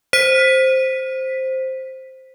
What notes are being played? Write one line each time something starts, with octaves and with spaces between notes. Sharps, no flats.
C5 B6